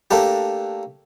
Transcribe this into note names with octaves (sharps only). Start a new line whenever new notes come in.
A3 A#3 D4 G4